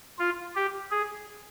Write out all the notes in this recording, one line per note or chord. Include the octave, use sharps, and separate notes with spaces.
F4
G4
G#4